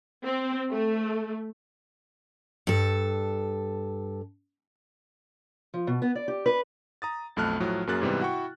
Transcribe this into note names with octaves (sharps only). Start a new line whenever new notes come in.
C4
A3
G2 A4
F3
B2
B3
D5
G4
B4
A#5 D#6 A6
B1 F2 A3 A5 F6 F#6
A2 F3 F#3
F#2 F#3 A#3 G#4 F#6 A6
G#2 C3 E3 G3 B3
E4 F#4 F#5 G5 C#6